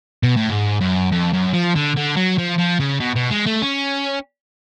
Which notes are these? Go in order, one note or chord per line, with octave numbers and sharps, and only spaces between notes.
B2
A2
G#2
F#2
F2
F#2
F3
D3
D3
F#3
F3
F3
C#3
B2
B2
G#3
A3
C#4